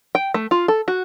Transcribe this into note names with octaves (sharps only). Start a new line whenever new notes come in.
G5
A3
F4
A4
F#4